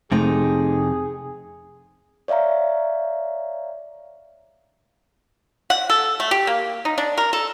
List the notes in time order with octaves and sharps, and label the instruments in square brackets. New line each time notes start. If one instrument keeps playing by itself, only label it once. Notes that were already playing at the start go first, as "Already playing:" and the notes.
[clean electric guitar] F2 C3 [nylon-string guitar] A3 D#4 A5 [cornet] G#4
[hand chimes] C#5 D5 E5 F5 A#5
[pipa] F#5
A4
A3
G4
A#3
D#4
D4
A#4
A4